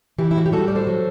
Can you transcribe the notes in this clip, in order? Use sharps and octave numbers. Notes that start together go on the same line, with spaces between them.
E3 E4 G4
E4
A2 F#4
G4
G3 F#4 A4
A2 D5
A4 C5
F#3